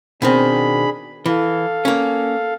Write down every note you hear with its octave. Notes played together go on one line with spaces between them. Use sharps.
B2 D#3 C4 D4 G#4 B5
E3 A4 F5
A#3 C#4